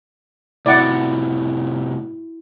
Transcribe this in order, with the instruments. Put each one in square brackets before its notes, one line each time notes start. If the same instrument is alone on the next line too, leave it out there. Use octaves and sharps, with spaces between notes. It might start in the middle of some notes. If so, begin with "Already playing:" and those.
[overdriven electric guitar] A2 C3 [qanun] E4 F#4 [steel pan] D5 F#5